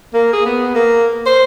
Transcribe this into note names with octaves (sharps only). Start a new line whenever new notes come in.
A#3
G#4
B3
A#3
C5